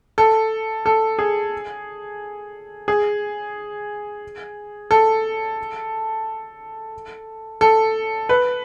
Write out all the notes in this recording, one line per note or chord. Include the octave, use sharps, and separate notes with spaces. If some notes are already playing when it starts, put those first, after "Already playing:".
A4
A4
G#4
G#4
A4
A4
B4